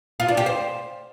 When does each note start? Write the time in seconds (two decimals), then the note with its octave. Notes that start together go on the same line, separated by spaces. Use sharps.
0.20 F4
0.28 D4
0.37 G4
0.46 C5